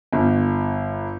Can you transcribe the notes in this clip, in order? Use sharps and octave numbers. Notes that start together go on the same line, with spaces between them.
G1